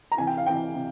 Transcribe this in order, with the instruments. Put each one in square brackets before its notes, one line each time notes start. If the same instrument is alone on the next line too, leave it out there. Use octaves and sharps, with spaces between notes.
[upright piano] A#5
C3 E3 G#5
G5
F5
C3 E3 G5
C3